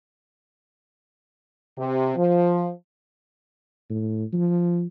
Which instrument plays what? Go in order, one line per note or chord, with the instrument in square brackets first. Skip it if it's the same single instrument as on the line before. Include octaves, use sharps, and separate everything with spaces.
[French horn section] C3
F3
[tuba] A2
F3